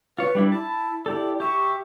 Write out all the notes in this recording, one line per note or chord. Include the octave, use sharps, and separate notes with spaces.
F4 B4 C#5
G3 D4 E4
E4 A5
E4 G4 A4 D5
G4 E5 C#6